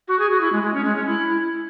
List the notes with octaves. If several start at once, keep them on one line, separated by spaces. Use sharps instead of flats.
F#4
G#4
F#4
E4
G#3
G#3
C#4
G#3
C#4
E4